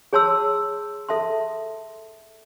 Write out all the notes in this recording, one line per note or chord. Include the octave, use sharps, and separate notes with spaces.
G#4 C#5 A5 C6 E6
A4 E5 A5 C6